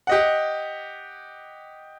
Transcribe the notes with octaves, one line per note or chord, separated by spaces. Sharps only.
G4 D#5 F#5